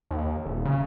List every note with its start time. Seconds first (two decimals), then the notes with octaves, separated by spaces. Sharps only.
0.11 D#2
0.45 D#1
0.65 C#3